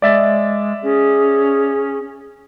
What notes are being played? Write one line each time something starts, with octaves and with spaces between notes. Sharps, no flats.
G#3 D5 E5 A6
C#4 G#4